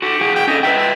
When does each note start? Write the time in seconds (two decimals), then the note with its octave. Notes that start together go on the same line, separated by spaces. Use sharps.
0.02 F#4 G4 A4
0.21 E4 F#4 G#4
0.35 G5
0.47 C#4 A4 D#5
0.63 B4 D#5 E5 G5
0.77 E5